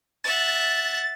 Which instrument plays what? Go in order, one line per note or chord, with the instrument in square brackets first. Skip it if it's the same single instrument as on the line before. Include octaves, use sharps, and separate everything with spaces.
[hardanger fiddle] E5 F#5 [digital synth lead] A6